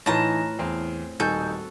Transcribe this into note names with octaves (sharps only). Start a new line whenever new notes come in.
A2 E3 D#4 F4 B4 A5 A#5
E2 C4 F5
D#1 D#4 F#4 A4 G#5 G6